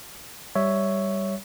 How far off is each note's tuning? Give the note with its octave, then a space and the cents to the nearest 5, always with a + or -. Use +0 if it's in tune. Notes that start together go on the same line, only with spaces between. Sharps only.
G3 +0 C#5 +0 E5 +0